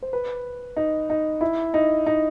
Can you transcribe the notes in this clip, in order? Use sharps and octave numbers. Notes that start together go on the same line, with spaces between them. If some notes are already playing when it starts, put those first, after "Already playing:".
C5
B4
D#4
D#4
E4
D#4
D#4